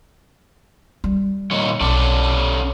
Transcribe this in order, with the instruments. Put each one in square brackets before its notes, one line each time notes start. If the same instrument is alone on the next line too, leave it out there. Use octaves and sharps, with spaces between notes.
[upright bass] G3
[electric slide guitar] A#2 D#3 C#5
[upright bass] B1 [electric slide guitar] C#4 A4 D5